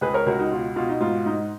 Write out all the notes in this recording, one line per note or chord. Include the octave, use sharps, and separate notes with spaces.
C#2 G#4 B4
A#4 C#5
C#2 F#4 A#4
D#4 F#4
B2 F4
B2 F4
D#4
G#2 F4
G#2 D#4